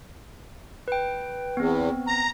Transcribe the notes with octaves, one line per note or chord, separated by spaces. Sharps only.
B4 G5
E2 B3 C4
A#5